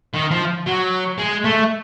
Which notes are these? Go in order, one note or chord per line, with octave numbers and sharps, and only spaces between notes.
D#3
F3
F#3
G#3
A3